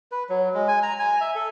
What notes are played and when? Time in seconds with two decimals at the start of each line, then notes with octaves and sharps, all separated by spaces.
0.12 B4
0.29 F#3
0.54 G#3
0.68 G#5
0.83 A#5
0.99 G#5
1.21 E5
1.35 A4